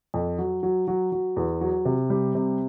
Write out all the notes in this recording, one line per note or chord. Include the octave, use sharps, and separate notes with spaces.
F2
F#3
F#3
F#3
F#3
E2
F#3
C3
G3
C3